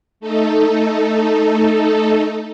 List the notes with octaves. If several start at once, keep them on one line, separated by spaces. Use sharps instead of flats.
A3 D#4 A4